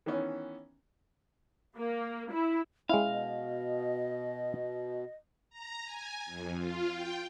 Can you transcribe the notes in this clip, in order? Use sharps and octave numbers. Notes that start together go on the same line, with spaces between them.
D#3 E3 B3 C#4
A#3
E4
G#3 C#4 E4 F5 G5
B2 D#5
A#5
G#5
F2
F4
G5